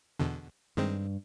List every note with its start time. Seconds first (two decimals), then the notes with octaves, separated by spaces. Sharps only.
0.20 E2 B2 D3
0.77 G2 D#3 G#3 C4